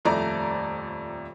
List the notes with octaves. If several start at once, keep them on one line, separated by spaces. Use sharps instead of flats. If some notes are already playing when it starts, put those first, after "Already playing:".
D#1 F2 A3 D5 A#5